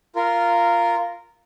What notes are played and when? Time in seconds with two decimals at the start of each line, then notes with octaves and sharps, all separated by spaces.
0.16 F4 A#4